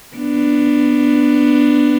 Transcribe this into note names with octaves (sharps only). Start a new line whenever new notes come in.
B3 D4